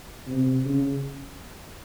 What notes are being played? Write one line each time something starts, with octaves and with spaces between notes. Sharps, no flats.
C3
C#3